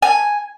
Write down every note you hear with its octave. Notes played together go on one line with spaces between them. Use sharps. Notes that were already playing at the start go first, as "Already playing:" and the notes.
G#5